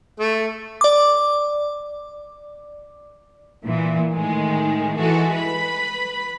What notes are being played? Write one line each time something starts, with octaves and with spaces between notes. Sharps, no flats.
A3
D5 D6
A#2 E3
A2 D#3 G#3
E3 G#3 F#4 A4
B4 B5